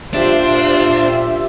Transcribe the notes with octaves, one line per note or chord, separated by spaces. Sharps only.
A#2 D4 F4 G4 C5 E5